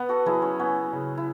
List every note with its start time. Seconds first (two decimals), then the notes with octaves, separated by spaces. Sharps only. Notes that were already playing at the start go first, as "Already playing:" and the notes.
Already playing: B3 B4
0.09 F#4 A4
0.26 F#3 E4 G#4
0.42 C#4
0.59 B3 C#4
0.93 C#3
1.17 E4